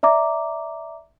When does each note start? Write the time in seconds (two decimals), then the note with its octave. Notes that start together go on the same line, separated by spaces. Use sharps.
0.03 D5 E5 A#5 D6